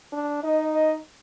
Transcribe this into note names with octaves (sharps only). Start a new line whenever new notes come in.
D4
D#4 D#5
D#5